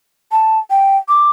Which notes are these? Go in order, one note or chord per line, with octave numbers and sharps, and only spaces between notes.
A5
G5
D6